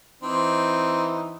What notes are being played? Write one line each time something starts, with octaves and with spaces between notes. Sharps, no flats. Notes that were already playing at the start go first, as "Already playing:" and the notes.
E3 C4 D#4